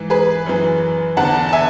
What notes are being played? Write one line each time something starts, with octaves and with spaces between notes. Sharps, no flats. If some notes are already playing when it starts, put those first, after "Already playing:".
Already playing: G#2 E3
G#4 B4
F#2 E3
E2 D3 F#5 A5
A5
E5 G#5